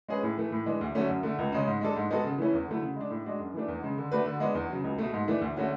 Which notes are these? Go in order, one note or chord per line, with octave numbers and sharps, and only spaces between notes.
G#3 C#4 G#4 B4
A2
E3 A3
A2
E3 G#3 D4
D2
D3 F#3 A3 C#4
F#2
D3 A3
C#2
C#3 G#3 C#4
G#2
G#3 D4 A4
G#2
G#3 B3 F#4 A4
C#3
E3 A3 C#4 E4
E2
D3 F#3 A3 E4
C#3
G#3 D4
A2
G#3 D4 F#4
F#2
E3 A3 D4
E2
C#3 G#3
D3
A3 D4 F#4 B4
D3
G#3 B3 D4
E2
C#3 F#3
C#2
B2 A3
G#2
E3 A3 D4
D2
D3 A3 C#4 F#4